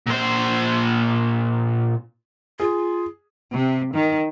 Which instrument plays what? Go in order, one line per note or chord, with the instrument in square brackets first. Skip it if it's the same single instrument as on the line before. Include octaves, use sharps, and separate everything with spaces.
[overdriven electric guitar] A#2 C5
[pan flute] F4 [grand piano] G#4
[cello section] C3
D#3